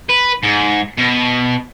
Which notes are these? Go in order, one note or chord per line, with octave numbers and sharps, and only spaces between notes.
B4
G#2
B2